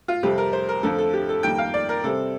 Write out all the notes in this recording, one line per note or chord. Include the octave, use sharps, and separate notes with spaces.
F4
F2 C3 G3 C4 G4
A#4
C5
A#4
F2 D3 F3 A3 A4
A4
G4
A4
F2 D#3 G3 A#3 G5
F5
D5
A#4
C3 G3 C4 A4